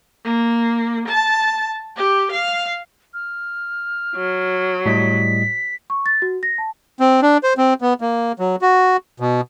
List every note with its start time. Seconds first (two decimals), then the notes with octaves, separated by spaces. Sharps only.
0.25 A#3
1.07 A5
1.96 G4
2.31 F5
3.14 F6
4.16 F#3
4.86 A2 G3 D#5 B6
5.90 C#6
6.06 A6
6.22 F#4
6.43 A#6
6.58 A5
7.00 C4
7.22 D4
7.43 C5
7.58 C4
7.81 B3
8.01 A#3
8.39 F#3
8.62 F#4
9.20 B2